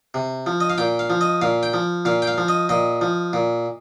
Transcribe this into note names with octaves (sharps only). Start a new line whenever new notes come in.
C3
F3
D#5
F5
A#2 G5
F5
F3
D#5
A#2 F5
G5
F3
A#2 F5
G5
F5
F3
D#5
A#2 D#5
F3
A#2